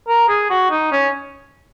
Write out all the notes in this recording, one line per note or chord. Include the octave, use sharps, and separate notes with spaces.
A#4
G#4
F#4
D#4
C#4